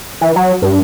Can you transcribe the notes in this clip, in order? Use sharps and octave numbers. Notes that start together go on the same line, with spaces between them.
E3
F#3
G2